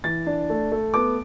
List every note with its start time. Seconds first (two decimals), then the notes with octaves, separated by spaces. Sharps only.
0.04 E3 A6
0.26 D4
0.50 A3
0.72 A3
0.94 B3 D6